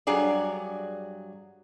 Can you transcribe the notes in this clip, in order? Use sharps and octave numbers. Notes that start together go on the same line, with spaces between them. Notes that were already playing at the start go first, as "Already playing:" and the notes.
G2 F#3 G#4 D5